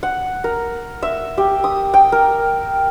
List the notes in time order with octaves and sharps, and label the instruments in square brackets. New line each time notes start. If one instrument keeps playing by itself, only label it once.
[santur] F#5
A#4
E5
G4
D#6
G5
A#4